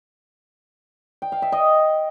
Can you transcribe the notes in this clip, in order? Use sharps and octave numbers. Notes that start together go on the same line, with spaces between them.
G5
F5
E5
D#5